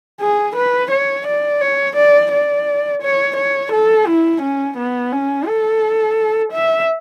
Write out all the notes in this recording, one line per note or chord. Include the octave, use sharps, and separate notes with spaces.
G#4
B4
C#5
D5
C#5
D5
D5
C#5
C#5
A4
E4
C#4
B3
C#4
A4
E5